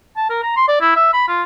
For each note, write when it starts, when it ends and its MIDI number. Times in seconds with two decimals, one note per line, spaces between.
0.16 0.28 81
0.30 0.41 70
0.43 0.56 82
0.56 0.66 84
0.68 0.77 74
0.81 0.91 64
0.96 1.10 76
1.13 1.25 83
1.28 1.43 65